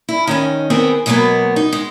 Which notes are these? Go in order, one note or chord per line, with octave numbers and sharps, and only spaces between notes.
E4
D#3 C#4 D#4
D#3 B3 C4 G#4
B2 F#3 G#3 A#3 B3
D#4
G#3